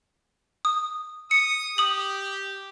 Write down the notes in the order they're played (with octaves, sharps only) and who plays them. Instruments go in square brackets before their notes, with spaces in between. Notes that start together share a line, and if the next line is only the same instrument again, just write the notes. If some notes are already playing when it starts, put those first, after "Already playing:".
[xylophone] D#6
[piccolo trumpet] D#6 [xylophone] C#7
[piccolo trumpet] G4 [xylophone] D#6 F#7